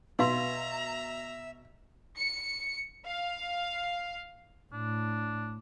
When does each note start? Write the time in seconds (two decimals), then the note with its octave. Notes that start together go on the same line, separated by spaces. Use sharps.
0.19 B2 B4 E5 F5 A#5 C6
2.17 C#7
3.05 F5
4.73 A2 D4